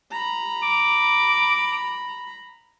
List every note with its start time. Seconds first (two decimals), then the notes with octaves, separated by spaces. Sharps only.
0.12 A#5 B5
0.63 D6